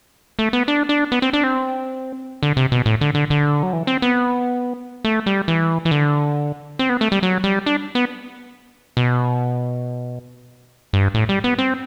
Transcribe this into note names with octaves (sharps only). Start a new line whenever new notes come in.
A3
B3
D4
D4
B3
C4
D4
C4
D3
C3
B2
A2
D3
D3
D3
F#3
E3
C4
B3
A3
G3
E3
E3
D3
C4
B3
A3
G3
F#3
G3
D4
B3
B2
G2
A2
G3
B3
C4